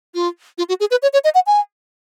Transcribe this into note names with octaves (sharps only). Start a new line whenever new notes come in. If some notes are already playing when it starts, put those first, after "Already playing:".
F4
F4
F#4
G#4
B4
C#5
C#5
D#5
F#5
G#5